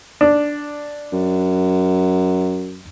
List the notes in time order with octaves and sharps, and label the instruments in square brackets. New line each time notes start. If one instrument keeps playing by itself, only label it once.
[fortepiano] D4
[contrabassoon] F#2